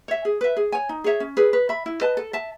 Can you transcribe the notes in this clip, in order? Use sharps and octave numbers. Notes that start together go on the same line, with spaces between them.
C#5 E5
G#4
B4 E5
G#4
C#5 G#5
D#4
G#4 C#5 E5
C#4
G#4 B4
B4
E5 B5
E4
B4 D#5 A5
A4
E5 A5